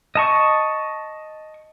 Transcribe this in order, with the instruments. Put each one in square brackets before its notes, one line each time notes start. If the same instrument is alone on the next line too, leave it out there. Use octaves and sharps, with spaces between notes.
[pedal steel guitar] D#5 A5 C#6